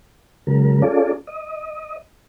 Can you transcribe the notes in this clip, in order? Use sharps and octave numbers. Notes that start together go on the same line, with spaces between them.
C#3 F#3 G#3 A#4
C#4 F4 G#4 A4 D5
D#5